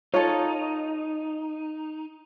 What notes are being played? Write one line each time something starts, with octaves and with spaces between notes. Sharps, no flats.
D#4 F4 A4 C#5